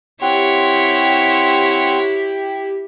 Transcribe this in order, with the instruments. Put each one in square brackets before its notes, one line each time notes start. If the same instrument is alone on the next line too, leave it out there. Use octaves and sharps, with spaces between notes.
[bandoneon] C4 F#5 C6 [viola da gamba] E4 [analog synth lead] G4 [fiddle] C#5